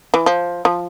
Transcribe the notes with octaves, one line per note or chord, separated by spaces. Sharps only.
E3
F3
F3